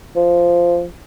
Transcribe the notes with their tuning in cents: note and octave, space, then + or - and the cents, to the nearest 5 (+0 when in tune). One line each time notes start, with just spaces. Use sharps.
F3 -10